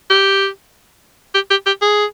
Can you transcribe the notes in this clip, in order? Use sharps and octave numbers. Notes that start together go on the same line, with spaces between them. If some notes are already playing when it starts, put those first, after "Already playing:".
G4
G4
G4
G4
G#4